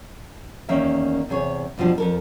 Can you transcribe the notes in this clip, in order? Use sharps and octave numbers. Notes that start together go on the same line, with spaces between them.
E2 D#3 A#3 C#4 E5
E2 C3 G#4 C#5
D#2 B2 F3 G3 D4
F2 A4 A#4